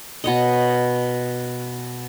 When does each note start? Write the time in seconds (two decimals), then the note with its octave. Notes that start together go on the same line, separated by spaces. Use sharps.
0.24 B2 C#5 D#5